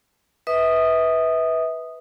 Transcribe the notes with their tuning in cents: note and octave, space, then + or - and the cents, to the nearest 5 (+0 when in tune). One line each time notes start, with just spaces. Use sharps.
B4 +0 E5 -35 D#6 -10